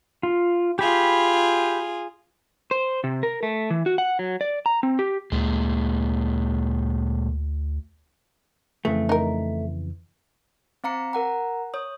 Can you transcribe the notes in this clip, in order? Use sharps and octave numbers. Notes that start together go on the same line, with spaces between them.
F4
F4 G4 G#4 B5
C5
C3
A#4
A3
E3
F#4
F#5
F#3
D5
A#5
C4
G4
D2 A#2 G#3
F2 C#3 E3 A3
D#4 A#4
C4 F5 A#5 C#7
A#4 F#5 A#5
C#5 D#6